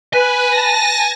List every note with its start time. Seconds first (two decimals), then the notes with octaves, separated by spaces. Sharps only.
0.13 B4 G#5
0.51 A5 A#6